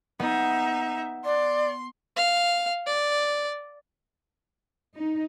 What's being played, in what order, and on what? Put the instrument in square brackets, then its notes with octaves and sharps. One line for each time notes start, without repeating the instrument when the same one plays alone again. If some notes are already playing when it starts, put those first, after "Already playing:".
[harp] B3 [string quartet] D#4 E5
[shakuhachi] D5 [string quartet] C6
[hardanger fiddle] F5
D5
[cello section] D#4